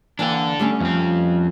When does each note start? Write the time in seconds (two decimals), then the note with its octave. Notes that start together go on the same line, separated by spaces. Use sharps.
0.19 E3 A#3 D4 A4 G5
0.59 G3 A3 C#4
0.81 F2 C4